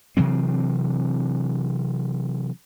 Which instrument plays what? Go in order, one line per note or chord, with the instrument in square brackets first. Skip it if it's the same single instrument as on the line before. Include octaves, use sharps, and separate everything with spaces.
[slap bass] C3 E3 F#3 C4